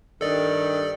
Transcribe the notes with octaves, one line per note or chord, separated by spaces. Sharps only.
G2 D#3 A4 D5